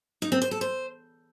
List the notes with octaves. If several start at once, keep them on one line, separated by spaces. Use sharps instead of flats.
D#4
C4
C5
A4
C5